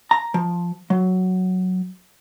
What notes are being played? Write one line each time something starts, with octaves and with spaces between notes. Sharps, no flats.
A#5
F3
F#3